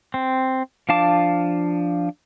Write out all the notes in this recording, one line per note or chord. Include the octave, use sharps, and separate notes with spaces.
C4
F3 D4 F5 A5 D6